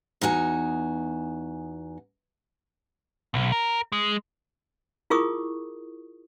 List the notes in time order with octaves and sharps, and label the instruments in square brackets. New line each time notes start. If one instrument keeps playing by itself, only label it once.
[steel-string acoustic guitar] E2 D#4 F#4 G#5
[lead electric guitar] B1
A#4
G#3
[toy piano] E4 F4 G#4 A#4 C#6 D#6